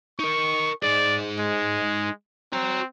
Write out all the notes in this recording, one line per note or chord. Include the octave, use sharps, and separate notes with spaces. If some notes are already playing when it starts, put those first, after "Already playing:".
D#4 A#4 C#6
D#4 G#4 D5
G#3
C4 F#4 A#5